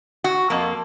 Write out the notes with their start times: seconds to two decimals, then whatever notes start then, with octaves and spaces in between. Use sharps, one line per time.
0.24 F#4
0.50 F2 A#3